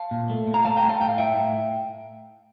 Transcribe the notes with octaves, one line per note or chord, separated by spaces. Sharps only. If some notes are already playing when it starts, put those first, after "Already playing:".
Already playing: F5 A5
A#2
A3
A#2
A#5
A3 F5 A5
G5 A#5
A3
F5 A5
A2 G5
F5
A2 E5 G5
A2